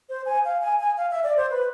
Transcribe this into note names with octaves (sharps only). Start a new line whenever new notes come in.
C5
G#5
F5
G#5
G#5
F5
E5
D5
C5
B4